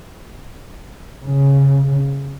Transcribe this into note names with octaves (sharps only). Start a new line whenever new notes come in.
C#3